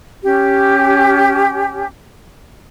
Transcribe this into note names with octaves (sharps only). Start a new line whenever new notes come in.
C#4 G4